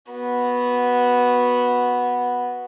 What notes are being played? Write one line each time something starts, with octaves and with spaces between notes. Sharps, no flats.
B3 F#4